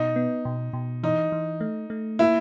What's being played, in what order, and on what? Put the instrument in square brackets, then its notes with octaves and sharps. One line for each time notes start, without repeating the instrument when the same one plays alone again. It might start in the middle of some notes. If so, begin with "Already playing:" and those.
Already playing: [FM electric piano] B2 [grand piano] D#4
[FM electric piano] B3
B2
B2
[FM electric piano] E3 [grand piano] D#4
[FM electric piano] E3
A3
A3
[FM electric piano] A#3 [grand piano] E4